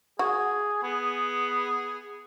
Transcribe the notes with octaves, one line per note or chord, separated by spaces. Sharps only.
F#4 G#4
B3 G#4